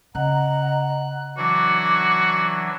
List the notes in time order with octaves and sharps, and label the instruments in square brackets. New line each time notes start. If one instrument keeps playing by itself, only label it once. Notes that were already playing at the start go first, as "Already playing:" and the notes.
[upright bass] C#3 [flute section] D#5 F#5 A#5 [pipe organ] F#6
[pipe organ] E3 F#3 D4 [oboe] F#4 [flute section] D6